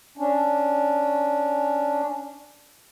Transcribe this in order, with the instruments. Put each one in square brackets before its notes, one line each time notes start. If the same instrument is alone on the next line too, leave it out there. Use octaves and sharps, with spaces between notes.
[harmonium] C#4 D4